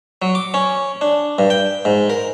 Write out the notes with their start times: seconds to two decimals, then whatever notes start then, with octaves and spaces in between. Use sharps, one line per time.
0.22 F#3
0.35 D6
0.54 C#4
1.01 D4
1.39 G2
1.50 G5
1.85 G#2
2.10 A#4